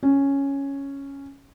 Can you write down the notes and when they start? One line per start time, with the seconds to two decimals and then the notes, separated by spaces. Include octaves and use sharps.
0.03 C#4